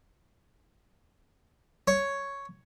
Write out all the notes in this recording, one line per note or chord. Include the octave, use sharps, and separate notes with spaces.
C#5